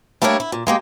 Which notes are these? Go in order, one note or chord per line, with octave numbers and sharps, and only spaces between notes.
G3 A3 A#3 D4 A#4 C#5
E4
A#2
G#3 A#3 G4